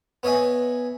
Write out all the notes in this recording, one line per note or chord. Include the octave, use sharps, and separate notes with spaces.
B3 C#5 D#5 E5 G#5